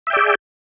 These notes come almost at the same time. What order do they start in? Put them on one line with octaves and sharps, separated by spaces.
E5 G5 D5 G#4